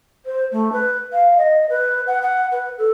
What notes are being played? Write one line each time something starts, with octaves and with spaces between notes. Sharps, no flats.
C5
A3
B4
F5
D#5
B4
F#5
F#5
B4
A4